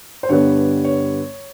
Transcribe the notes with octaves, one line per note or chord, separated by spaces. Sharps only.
C5
G2 D3 G3 B3 C#5
C#5